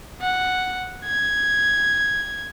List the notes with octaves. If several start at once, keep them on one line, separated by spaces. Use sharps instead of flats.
F#5
G#6